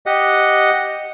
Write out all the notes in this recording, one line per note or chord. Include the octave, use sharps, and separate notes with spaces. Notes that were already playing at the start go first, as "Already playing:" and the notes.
G4 D#5 F#5